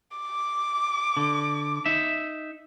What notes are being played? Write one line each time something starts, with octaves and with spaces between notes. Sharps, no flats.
D6
D3
D#4 E5